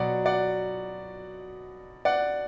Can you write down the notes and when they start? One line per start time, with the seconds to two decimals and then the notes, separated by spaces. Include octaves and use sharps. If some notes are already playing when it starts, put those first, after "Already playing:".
Already playing: B2 F#3 D5 F#5
0.26 D5 F#5
2.05 D5 F#5